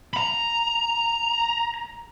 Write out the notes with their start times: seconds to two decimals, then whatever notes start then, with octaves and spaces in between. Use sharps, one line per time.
0.14 A#5 B5